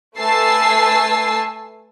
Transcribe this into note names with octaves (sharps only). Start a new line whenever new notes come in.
A3 B4 G#5 A5 E6 C7